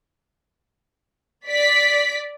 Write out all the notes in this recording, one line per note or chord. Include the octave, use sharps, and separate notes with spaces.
D5 B6